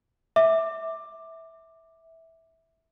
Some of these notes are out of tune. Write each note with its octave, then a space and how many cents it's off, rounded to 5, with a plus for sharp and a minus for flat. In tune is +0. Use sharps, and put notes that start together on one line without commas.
E5 -15 D6 +10